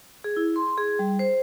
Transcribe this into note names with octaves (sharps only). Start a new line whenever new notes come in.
G#4
E4
C6
G#4
G3
C5